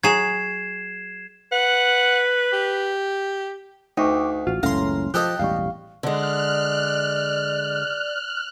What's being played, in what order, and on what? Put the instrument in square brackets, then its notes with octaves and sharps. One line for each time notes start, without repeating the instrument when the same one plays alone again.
[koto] F#3 G#4 [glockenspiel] G#6 C7 E7
[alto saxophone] B4 [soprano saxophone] F#5
[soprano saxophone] G4
[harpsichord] D2 [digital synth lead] D#4 [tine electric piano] G5 C#6 D6
[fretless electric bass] A1 [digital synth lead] F4 [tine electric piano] F#4
[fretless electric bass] F#1 C#2 A2 [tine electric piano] C#4 [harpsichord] F5 C6 [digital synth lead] A#5
[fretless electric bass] F3 [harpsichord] G4 A4 D#5 [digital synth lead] G5 [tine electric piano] F#6
[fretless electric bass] E1 A1 G3 [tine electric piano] F5 C#6
[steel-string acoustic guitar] D3 G#3 [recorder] D5 [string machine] F6 F#6